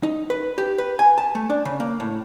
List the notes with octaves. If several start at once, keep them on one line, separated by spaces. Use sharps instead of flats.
D#4
B4
G4
B4
G#5
A5
A3
D4
C#3
A#3
A2